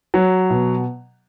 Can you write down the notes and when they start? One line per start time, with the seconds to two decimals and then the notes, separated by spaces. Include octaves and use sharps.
0.14 F#3
0.50 B2